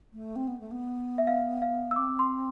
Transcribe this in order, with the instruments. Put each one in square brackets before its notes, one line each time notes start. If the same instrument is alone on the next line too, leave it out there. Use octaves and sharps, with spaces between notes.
[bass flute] A3
C4
B3
A3
B3
[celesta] E5
F5
F5
E6
[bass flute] C4 [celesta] D6
[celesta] C6